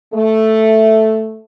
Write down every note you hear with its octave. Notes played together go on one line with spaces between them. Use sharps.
A3